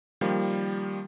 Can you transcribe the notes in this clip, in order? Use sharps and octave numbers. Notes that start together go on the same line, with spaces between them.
D#3 F3 G3 A#3